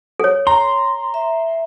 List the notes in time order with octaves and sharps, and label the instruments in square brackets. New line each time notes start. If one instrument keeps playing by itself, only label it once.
[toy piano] A4 C#5
[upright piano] A#5 [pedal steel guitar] C6
[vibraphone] E5